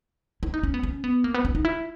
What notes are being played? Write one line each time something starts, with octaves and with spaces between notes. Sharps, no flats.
E4
D#4
C#4
B3
C#4
B3
A#3
B3
C#4
D#4
E4